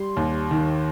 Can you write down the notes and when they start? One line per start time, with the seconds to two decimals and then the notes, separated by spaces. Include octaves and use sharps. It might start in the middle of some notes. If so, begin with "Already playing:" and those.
Already playing: G3 C6
0.16 D#2
0.51 D#3